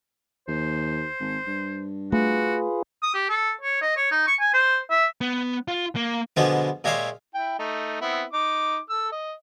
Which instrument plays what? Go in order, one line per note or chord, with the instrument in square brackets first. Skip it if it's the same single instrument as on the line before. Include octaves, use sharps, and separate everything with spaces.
[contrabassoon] D#2 [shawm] C5
[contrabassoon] G#1
G2
[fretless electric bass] A3 [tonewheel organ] F4 G#4 B4 [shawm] F#4
[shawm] D#6
G4
A4
C#5
D#5
C#5
D#4
C#6
G#5
C5
E5
[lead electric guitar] B3
F4
A#3
[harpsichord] B2 D3 F3 G3 G#3 B3
A#2 G#3 G4 C#5 E5 F5
[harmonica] E4 G5
A3 D#4
B3 C4 E4
D#4 D6
A4 E6
D#5